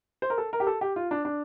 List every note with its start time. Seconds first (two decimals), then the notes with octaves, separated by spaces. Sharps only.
0.22 C5
0.30 A#4
0.38 A4
0.53 A#4
0.60 G4
0.67 A4
0.81 G4
0.96 F4
1.11 D4
1.25 D4